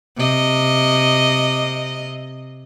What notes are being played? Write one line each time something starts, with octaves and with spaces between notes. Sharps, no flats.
C3 D#5